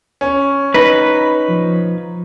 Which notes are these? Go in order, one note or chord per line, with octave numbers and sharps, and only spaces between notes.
C#4
D#4 B4 B5
F3